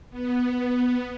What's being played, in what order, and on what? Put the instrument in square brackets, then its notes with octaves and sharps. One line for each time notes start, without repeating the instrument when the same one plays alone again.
[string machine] B3